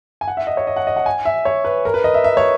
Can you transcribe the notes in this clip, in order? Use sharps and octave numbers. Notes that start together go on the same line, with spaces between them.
G#5
F#5
E5
D#5
C#5
D#5
F#5
D#5
F#5
G#5
E5
C#5
B4
A#4
B4
D#5
E5
E5
C#5